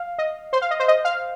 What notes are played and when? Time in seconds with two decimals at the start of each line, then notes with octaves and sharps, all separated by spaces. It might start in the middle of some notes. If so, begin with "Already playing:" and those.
Already playing: F5
0.18 D#5
0.53 C5
0.62 F5
0.71 D#5
0.80 C5
0.88 D#5
1.05 F5